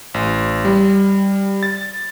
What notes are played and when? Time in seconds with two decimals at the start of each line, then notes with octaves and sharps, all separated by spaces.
0.14 A1
0.65 G3
1.63 A6